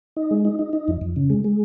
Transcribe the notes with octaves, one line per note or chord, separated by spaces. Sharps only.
D#4
G#3
D#4
D#4
D#4
F2
F2
C#3
G#3
G#3